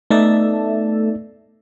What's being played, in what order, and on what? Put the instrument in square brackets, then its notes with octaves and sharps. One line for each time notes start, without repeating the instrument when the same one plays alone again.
[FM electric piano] A3 A4 E5 [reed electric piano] B3 D#4 D5